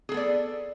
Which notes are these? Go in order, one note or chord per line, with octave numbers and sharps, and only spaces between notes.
B3 G#4 A4 D5